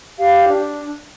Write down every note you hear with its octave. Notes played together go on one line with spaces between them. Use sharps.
G4 F5
D4